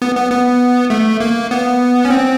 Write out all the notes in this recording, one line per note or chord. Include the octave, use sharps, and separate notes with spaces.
B3
B3
B3
A3
A#3
B3
C#4
C4